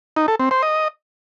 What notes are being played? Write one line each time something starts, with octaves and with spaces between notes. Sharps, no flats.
D#4
A4
C4
C5
D#5